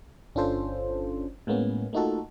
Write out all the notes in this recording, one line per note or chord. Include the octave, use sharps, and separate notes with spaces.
G1 C#4 D4 F4 A4 C5
A2 G#3 A#3 B3 C#4
A3 A#3 D#4 F4 F#4 A4